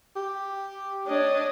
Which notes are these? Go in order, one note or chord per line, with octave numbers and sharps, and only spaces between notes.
G4
D4 C#5 D#5